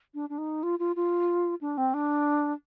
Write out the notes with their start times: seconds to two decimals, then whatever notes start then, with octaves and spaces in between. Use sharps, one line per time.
0.14 D4
0.29 D4
0.38 D#4
0.63 F4
0.79 F4
0.96 F4
1.61 D4
1.77 C4
1.94 D4